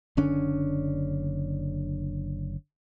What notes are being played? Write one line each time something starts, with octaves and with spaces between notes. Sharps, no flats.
F#1 D3 C#4 D4